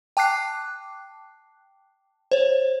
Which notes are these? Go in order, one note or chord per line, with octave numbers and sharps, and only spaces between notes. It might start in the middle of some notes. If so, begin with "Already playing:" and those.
G5 A5 D6 F#6 C7
C5 C#5